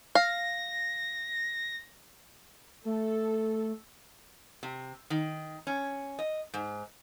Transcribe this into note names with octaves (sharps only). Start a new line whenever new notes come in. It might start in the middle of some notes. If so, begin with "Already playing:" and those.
F5 A#6
A3 A4
C3
D#3
C#4
D#5
G#2